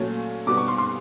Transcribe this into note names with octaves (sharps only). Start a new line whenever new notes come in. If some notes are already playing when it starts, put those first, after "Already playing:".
Already playing: A#2 F#3 A3 C#4
B2 G3 B3 D6
C#6
C6
C6